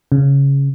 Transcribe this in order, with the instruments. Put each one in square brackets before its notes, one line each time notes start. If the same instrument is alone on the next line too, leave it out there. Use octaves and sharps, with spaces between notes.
[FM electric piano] C#3